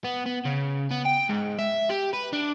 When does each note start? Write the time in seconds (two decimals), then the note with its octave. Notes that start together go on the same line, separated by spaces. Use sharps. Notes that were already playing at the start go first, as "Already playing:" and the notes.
0.04 B3
0.26 B3
0.45 C#3
0.91 B3
1.06 G5
1.30 G#2
1.59 E5
1.89 G4
2.13 B4
2.33 D4